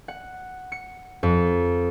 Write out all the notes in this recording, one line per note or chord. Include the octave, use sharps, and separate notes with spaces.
F#5
C#7
F2